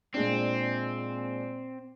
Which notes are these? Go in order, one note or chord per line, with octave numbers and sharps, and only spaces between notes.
A#2 G#3 C4 D4